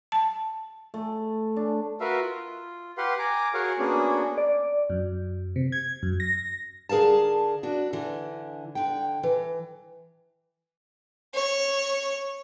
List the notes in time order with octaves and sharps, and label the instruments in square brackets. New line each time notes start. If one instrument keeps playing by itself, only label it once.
[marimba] A5
[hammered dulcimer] A3
D4
[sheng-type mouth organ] F#4 A#4 B4 E5 F5
F4
G4 B4 F5 F#5 C6
G#5 A#5 D6
F#4 G#4 A#4 C#5 F5 F#5
A#3 B3 C#4 D4 F#4 G#4
[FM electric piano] D5
F#2
C3
G#6
F#2
A#6
[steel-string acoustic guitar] D3 G#4 A#4 F5 A5
D4 F#4
D3 E3
D3 G5
E3
[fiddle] C#5